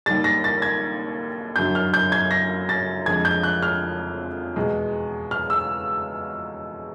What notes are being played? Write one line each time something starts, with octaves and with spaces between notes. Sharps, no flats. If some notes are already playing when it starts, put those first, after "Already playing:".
D#2 D#3 G3 A6
A#6
A6
G#6
F#2 D3 F#3 G6
F6
G6
G#6
A#6
A6
F2 D3 F3 G#3 G#6
G6
F#6
F6
E2 B2 G#3
F6
E6